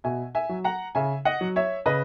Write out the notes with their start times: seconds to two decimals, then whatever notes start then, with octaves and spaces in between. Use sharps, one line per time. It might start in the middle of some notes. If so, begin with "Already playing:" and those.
0.04 B2 E5 G#5
0.35 E5 G#5
0.49 F#3
0.64 F#5 A#5
0.95 C#3 E5 G#5
1.25 D#5 F#5
1.41 F#3
1.56 C#5 E5
1.86 C#3 B4 D#5